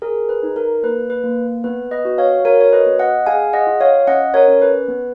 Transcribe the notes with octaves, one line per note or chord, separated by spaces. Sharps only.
G#4 A#4
B4
D#4
A#4
A#3 B4
B4
A#3
B3 B4
B4 D#5
F#4
C#5 F5
F#4 A#4 C#5
C#5
B4 D#5
B3
D#5 F#5
G#4 F5 G#5
D#5 F#5
F4
C#5 F5
C#4 D#5 F#5
A#4 C#5
C#4
B4
B3